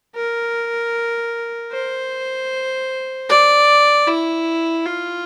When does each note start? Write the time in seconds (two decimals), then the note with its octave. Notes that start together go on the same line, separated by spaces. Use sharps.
0.15 A#4
1.72 C5
3.29 D5
4.07 E4
4.86 F4